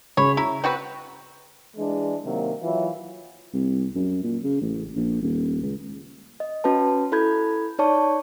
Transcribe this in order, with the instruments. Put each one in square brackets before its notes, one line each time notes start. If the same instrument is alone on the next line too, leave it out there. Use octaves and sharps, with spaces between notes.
[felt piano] C#3 B5 [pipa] C#5
[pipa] E4 [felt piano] A#5
[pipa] C4 F#4 B4
[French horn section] E3 G#3 D4
C3 D#3 F#3 A#3
E3 F#3 E4 F4
[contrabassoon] C2
F#2
A#2
C#3
A1
A#1
D#1
C#2
[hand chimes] D#5
C#4 F#4 B4 A5
E4 A4 B5 G6 G#6
D#4 C#5 D5 A5 C#6